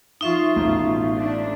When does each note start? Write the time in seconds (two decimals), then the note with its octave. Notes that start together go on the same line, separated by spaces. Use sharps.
0.21 F3 D#4 F4 E5 C#6
0.56 A1 B2 F4
1.15 A3 D4